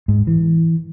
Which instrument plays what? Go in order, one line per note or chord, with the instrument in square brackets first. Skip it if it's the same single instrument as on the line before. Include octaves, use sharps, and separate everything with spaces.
[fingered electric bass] G#2
E3